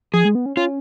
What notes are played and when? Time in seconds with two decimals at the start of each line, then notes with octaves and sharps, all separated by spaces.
0.13 F3 G#4
0.25 G#3
0.35 B3
0.46 C#4
0.57 C#4 F4